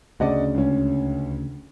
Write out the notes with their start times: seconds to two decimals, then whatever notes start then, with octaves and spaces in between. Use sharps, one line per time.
0.20 D2 C#3 D5 D#5 F#5
0.54 C#2 C#4